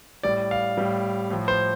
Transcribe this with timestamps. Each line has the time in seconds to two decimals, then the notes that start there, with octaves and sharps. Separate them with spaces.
0.23 A2 G3 D5
0.51 F5
0.78 A2 G3
1.30 A2 F3
1.48 C5